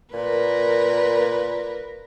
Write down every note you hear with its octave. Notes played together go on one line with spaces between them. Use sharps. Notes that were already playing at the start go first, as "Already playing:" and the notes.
A#2 A#4 B4